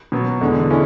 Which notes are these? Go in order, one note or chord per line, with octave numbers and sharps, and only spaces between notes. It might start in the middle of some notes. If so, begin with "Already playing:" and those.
B2 F#3 B3
E2 D3 G#3
D3 G#3 C#4 E4